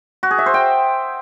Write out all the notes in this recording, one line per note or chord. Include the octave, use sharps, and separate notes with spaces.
F#4
G#4
E5
C5
G5